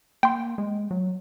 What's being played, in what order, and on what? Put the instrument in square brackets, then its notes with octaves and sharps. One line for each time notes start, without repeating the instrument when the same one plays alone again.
[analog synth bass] A#3 [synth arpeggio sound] G5 C6
[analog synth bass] G#3
F#3